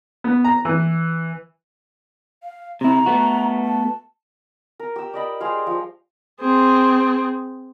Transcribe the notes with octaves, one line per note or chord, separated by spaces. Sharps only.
B3
A#5
E3
F5
C3 E4 A#5
A3 B3 F#4
A5
A#4
G4 E6
D5 D#5 B5
G3 G#4 C5 F5
F3
C4 G#4